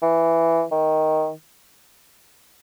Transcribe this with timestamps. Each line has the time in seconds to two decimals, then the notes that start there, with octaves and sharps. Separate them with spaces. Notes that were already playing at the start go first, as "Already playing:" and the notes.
0.02 E3
0.72 D#3